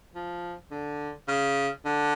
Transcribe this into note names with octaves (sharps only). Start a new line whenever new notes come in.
F3
D3
C#3
D3